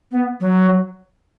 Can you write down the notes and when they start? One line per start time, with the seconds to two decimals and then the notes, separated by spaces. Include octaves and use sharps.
0.12 B3
0.40 F#3